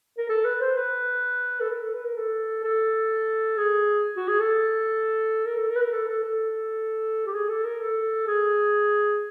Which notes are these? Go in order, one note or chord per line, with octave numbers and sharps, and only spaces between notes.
A#4
A4
B4
C5
B4
A4
A#4
A4
B4
A#4
A4
A4
G#4
F#4
G#4
A4
A#4
A4
A#4
B4
A#4
A4
A4
A4
G4
G#4
A4
A#4
A4
G#4